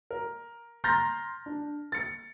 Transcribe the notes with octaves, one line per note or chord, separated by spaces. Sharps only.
A#4
A#5 C6 F6 G6 A6 A#6
D4
A6 C#7